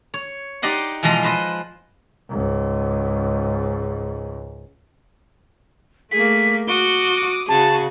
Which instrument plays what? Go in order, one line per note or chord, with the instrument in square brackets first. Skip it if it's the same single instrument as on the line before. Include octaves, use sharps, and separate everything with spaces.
[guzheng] C#5
D#4 G4 D5 D#5 F#5 C6
B2 E3 F3 G#3 D#5 A#5
B4 C5 D#5
[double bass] C#2 G#2
[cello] A3 A#3 [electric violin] G#4 [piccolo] B6
[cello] F#4 [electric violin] D6 D#6 [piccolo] G7
[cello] C#3 [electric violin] F#4 G#4 [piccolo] A5